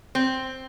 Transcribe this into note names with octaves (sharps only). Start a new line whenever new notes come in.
C4